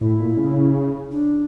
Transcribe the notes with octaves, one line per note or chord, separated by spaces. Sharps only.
A2 E4
A#2
C#3
D4